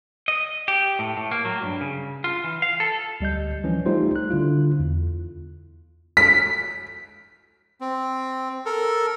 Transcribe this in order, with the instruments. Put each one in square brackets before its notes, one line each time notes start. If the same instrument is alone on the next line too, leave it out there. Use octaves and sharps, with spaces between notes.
[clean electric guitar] D#5
G4
A2
A2
A#3
F#3
G2
C#3
F4
E3
F5
A4
[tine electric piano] D2 G3 D#5 G6
E3 F3 C#4
G3 A3 D#4 F4 G4 C5
F#6
D3 E4 F4
E2
[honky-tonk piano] B6
[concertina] C4
A4 A#4